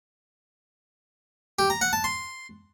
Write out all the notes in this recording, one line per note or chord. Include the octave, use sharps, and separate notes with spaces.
G4
A#5
F#5
A5
C6